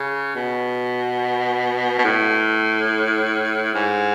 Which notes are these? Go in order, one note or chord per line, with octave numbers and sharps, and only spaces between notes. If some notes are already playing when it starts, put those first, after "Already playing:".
Already playing: C#3
B2
B2
A2
G#2